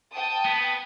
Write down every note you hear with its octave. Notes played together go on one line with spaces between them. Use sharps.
G5 A5 D#6
B3